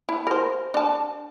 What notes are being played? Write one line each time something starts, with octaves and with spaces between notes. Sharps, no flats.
E4
A#4 C5
D4 A5